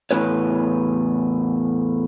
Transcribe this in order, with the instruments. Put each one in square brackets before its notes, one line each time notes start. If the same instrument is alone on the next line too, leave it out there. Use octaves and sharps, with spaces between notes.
[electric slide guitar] E2 A2 C4 B4 C#5